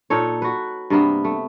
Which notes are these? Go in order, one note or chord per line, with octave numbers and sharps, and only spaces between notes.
A#2 D#4 A4 C#5
F#4 B4
G2 C3 A#3 B3
A3